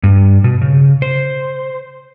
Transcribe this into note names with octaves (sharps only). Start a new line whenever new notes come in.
G2
B2
C#3
C5